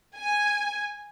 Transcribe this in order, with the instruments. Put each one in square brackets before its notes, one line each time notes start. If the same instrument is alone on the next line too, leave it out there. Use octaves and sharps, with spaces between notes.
[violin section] G#5